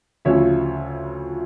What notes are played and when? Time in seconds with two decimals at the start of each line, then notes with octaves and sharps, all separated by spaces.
0.25 D2 C#3 F3 C#5 E5